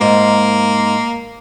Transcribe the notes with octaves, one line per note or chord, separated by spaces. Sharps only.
G#2 A#3